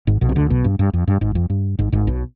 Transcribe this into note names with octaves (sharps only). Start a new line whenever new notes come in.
G#1 G#2
B1 B2
C3
D2 D3
B1 B2
G2
G2
F2
G2
G#1 G#2
F2
G2
G#1 G#2
G#1 G#2
B1 B2